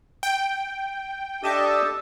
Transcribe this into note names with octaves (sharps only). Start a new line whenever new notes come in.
G5
D4 G4 A4 D#5 E5 A5